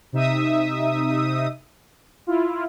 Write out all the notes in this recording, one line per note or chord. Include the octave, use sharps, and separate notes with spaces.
C3 D#4 E5 D#6
E4 F4